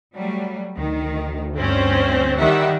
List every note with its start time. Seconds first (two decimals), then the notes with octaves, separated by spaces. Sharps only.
0.14 F#3 G3 A3
0.77 D2 D#3
1.57 G2 C4 C#4 C5
2.38 D#3 G3 E5 F#5